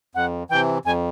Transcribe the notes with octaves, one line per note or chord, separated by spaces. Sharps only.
F2 F#5
C3 E3 G5
F2 G#5